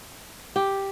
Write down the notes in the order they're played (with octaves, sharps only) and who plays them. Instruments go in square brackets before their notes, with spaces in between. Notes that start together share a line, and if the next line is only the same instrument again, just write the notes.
[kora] G4